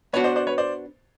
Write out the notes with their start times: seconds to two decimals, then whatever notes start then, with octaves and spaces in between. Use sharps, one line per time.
0.13 B3 D4 F#4 B4 C#5
0.24 C5 D5
0.36 C5 D5
0.47 B4 C#5
0.58 C5 D5